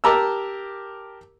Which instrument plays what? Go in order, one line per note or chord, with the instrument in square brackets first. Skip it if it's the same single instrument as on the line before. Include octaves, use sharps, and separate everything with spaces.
[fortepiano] G4 A#4 A5 A#5 D6 E6